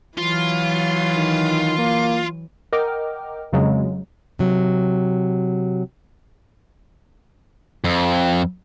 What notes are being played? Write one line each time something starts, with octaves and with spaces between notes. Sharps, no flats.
E3 F#3 F4
D#3
A#3
A#4 D#5 F#5 G5 D6 F6
F2 C#3 F#3 G#3
C3 F#3
F2